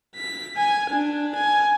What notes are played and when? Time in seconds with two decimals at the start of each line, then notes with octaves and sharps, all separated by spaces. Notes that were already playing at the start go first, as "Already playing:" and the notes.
0.16 B6
0.57 G#5
0.90 D4
1.36 G#5